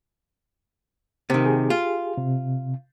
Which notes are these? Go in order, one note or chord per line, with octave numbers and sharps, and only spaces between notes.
C3 D#3
G4 G#4
F4
C3